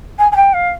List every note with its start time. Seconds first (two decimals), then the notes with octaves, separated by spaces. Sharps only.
0.18 G#5
0.31 G#5
0.36 G5
0.53 F5